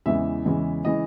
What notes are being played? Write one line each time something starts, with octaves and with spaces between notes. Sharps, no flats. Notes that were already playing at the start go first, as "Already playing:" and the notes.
E2 C#3 E3 G#3 E5
E2 C#3 E3 G#3
C#3 E3 G#3 D#5